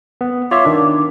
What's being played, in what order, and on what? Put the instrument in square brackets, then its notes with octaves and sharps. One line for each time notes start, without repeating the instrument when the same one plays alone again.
[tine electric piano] B3
[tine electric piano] F4 C#5 E5 [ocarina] D6
[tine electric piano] D#3 D4